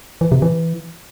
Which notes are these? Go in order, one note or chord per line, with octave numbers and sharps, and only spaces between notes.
E3
C3
E3